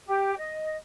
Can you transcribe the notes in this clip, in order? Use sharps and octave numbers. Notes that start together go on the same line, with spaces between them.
G4
D#5